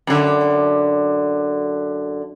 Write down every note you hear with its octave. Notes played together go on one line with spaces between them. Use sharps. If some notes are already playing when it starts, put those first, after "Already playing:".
F#2 D3